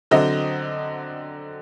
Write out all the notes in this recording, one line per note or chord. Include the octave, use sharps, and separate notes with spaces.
D3 F#3 C4 D#5